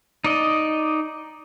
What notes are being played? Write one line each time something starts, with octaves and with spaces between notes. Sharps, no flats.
D#4 D5 D#5